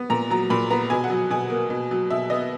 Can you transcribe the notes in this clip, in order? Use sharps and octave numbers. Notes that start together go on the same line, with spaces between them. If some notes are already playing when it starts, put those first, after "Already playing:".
Already playing: B3
A#2 A#5
F#3 A#5
A#2 B5
B3 A#5
B2 G#5
F#5
F#3
B2 G#5
A#3
B2
F#3
B2 E5
B3 D#5